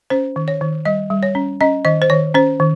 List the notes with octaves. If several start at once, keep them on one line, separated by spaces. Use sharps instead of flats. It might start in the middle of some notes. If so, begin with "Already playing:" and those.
C#4 C5
D#3
C#5
D#3
G3 D#5
G3
C#5
C#4
C#4 D#5
D#3 D#5
C5
D#3 C#5
C#4 C5
D#3